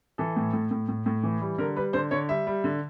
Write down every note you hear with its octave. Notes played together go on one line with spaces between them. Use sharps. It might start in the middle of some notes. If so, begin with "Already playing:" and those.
E3 A4
A2
A2
A2
A2
A2
E3
G3
D3 A#4
G3 B4
D3 C5
D3 C#5
G3 E5
G3
D3